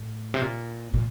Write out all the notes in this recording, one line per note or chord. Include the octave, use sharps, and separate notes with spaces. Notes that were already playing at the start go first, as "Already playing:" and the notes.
Already playing: A2
C3
A#2
A#2